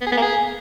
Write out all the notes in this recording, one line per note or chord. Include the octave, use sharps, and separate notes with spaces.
B3
G#4
B3
A#3
G#4